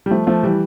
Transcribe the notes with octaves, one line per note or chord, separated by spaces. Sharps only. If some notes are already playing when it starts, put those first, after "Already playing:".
G3
F3 A3
F3 A3
E3 G3